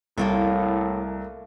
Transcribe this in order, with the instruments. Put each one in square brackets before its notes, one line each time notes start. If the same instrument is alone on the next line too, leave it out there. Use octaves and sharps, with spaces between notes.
[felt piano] C2 [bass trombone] A2 [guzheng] A3 A#3 F4